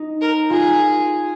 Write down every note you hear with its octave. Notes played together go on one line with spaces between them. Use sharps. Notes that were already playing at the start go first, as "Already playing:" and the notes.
Already playing: D#4
A#4
F4 G#4